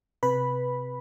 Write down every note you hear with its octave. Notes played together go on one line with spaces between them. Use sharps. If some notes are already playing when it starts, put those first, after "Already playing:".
C3 B4 B5